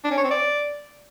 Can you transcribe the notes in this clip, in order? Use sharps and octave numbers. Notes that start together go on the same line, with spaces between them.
D4
C#4
C#5
C4
D5